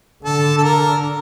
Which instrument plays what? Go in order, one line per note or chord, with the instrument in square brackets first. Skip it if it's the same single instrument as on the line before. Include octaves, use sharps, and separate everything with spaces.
[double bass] D3 [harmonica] A4
[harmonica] A4
A#4